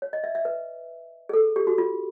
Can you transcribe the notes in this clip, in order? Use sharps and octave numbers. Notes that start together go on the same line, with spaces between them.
C#5
D#5
E5
E5
B4
G#4
A4
G4
F#4
F4